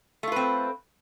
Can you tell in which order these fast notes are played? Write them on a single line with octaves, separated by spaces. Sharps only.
A3 F4 B4 C4